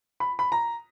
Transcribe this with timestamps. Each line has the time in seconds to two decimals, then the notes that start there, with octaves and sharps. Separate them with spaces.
0.20 B5
0.39 B5
0.52 A#5